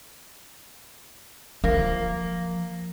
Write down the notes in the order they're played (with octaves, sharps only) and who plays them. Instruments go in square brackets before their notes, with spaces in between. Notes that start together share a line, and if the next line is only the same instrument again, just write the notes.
[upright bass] F3 [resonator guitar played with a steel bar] A#3